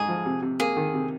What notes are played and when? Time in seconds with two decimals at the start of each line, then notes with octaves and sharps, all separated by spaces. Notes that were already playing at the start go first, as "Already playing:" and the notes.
Already playing: G#2 G#3 D#4 G#4
0.08 F3
0.26 C3
0.42 C3
0.60 A#3 G#4
0.77 D#3
0.94 C3